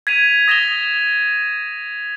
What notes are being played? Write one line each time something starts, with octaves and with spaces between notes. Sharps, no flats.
G#6 B6 D#7 F7
D#6 A#6 E7 F7 G7